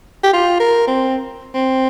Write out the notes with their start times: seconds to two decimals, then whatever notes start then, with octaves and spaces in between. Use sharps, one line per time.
0.23 G4
0.33 F4
0.60 A#4
0.87 C4
1.54 C4